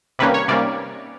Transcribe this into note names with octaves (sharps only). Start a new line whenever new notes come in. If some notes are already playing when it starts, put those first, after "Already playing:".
C3 D#3 G3 A#3 C#4 B4
C#5
C3 D#3 G3 A#3 C#4 D5